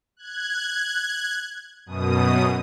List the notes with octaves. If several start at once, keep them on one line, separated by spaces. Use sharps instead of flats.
F#6 G#6
F#2 B2 D#6